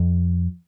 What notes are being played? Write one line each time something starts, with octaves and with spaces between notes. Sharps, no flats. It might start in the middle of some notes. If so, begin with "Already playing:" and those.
Already playing: F2